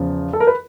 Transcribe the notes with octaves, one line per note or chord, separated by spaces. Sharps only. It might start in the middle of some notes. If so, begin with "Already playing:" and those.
Already playing: E2 C#3 F3
A4
A#4
B4